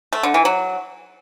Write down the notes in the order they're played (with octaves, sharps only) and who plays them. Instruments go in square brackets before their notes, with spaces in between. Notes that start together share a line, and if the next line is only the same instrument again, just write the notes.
[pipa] A3
D3
E3
F#3